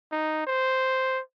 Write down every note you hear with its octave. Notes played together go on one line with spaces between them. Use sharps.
D#4
C5